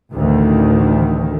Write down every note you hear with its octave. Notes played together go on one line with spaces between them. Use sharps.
A1 D2 D#3